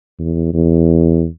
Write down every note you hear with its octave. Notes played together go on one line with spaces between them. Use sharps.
E2
E2